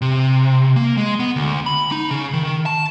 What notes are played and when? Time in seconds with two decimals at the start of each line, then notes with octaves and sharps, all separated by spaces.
0.02 C3
0.76 A#3
0.97 G#3
1.20 B3
1.36 D2
1.66 B5
1.92 D#4
2.11 C#3
2.33 D#3
2.66 A5